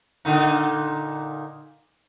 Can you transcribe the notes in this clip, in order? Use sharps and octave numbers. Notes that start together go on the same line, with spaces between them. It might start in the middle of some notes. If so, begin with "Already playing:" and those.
A#2 D3 D#4